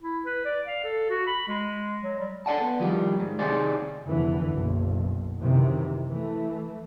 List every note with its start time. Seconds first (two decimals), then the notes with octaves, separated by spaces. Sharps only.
0.02 E4
0.26 B4
0.45 D5
0.66 F5
0.84 A4
1.10 F#4
1.27 B5
1.47 G#3
2.03 F#3
2.19 G3
2.46 A4 D5 F#5 A5
2.61 B3
2.80 D#3 F3 G3
3.20 G#2
3.39 C3 D#3 G#4 C5 D5
4.06 F1 E2 D3 E3
4.51 F#1 B1
5.41 F#2 C3 D#3 E3
6.09 E3 A3